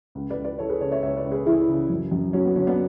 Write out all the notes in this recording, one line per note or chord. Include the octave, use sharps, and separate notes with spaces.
C#2
B4 D5
C#2
B4 D5
E3 A4 C#5
G#4 B4
C#3 A4 C#5
C#5 E5
C#2 C#5 E5
B4 D5
C#2
G#4 B4
E3 E4 G#4
C#3
F#2
F#2
F#3 C#4
B3
D3 C#4
B3 D4